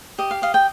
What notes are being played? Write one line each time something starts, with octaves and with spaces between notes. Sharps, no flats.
G4 D#5
F5
D#5 F5
G5